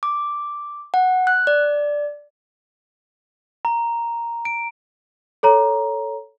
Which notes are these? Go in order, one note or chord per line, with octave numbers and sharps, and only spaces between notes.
D6
F#5
F#6
D5
A#5
D7
A4 C#5 A#5